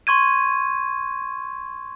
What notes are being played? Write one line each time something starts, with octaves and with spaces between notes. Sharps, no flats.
C6 C#6 G#6 D#7